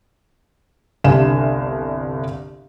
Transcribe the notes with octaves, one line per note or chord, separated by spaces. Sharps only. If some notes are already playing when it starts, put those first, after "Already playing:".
G1 C2 D4 F5 G#5 E7